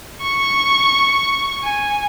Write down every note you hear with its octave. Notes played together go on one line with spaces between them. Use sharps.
C#6
G#5